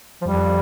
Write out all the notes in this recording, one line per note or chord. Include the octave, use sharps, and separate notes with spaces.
F3
F2 G3